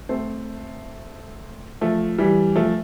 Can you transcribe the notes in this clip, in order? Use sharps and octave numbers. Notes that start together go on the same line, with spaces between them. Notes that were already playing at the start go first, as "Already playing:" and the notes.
A3 C4
F3 A3
E3 G3
F3 A3